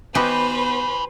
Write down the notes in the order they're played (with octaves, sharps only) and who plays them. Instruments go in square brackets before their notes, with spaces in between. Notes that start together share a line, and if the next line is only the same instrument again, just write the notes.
[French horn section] B3 [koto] D#4 F#4 G4 [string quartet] B4 C5 [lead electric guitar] G#5 B5